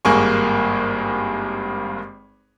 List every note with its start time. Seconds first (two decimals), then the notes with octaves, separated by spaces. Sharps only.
0.05 G#1 G2 A#3 G#4 C#6